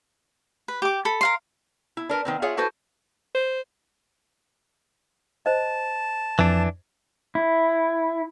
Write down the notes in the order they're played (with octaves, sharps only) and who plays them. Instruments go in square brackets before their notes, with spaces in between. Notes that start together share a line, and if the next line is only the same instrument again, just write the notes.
[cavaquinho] B4
G4 D6
A4 B5
A#4 F5 C6
[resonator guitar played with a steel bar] E4
D4 A#4 B4
D#3 B3 C4
F4 G#4 C#5 E5 F#5
E4 F#4 A4 B4 C5
[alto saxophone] C5
[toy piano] C5 D#5 [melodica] A5
[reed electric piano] F2 [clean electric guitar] E3 D4
[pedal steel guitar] E4